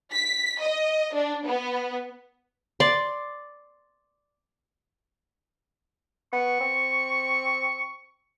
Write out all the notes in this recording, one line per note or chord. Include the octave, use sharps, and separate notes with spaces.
B6
D#5
D4
B3
D5 C6
B3 C#6
C4